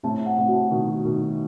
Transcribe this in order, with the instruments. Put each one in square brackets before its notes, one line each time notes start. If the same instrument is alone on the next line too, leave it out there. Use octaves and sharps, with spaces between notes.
[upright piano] A2 C3 [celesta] A5
[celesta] F#5
[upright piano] A2 C3
[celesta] F#4
[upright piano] B2 D#3 [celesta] F#4
[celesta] F#4
[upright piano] B2 D#3
[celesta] F#4